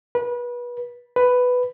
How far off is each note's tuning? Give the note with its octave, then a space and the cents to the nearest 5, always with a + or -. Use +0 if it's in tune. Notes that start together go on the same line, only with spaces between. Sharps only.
B4 -30
B4 +5